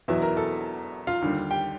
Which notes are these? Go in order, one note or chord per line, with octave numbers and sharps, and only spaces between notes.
E1 E2 B2 F#3 B3 E4 E5
A#4 A#5
A4 A5
F4 F5
D#2 D3 G3
G4 G5